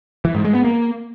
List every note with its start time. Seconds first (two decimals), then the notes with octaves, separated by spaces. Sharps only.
0.25 E3
0.35 G#2
0.45 G#3
0.54 B3
0.64 A#3